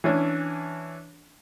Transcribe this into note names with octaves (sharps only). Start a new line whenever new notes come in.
E3 C#4 D4